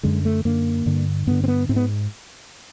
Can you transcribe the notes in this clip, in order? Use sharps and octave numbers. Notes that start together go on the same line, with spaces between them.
F#2 D3 G#3
A3
F#2 D3 A#3
G2 D3
G2 D3 B3
C4
B3
G#2 C4
B3